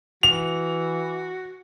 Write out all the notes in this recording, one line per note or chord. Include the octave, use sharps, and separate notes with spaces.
E3 F#4 F7